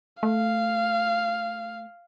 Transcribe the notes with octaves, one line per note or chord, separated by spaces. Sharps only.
A3 F5